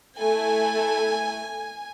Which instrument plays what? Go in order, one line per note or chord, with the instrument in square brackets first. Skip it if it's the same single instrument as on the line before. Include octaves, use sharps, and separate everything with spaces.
[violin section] A3 E4 A4 G#5